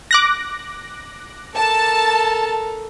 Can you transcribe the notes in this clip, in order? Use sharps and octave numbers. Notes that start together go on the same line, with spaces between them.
D6 F#6 A#6
A4 A#4 A5